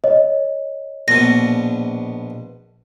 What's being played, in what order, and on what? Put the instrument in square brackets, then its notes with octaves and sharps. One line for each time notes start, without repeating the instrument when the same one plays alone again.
[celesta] C#5 D#5
[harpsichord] A#1 B2 [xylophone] A#6